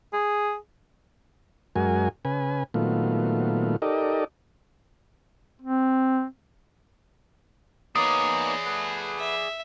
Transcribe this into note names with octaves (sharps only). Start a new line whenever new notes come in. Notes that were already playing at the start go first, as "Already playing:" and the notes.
G#4
F#2 G#3 F#4 A#4 G#5
C#3 B4 G#5
A#2 D#3 F#3 A3 B3 F4
D#4 G4 A4 A#4 D5 D#5
C4
A#3 B3 D#4 G#4 C#5 D5 D#6
A3 B4 F#5
E5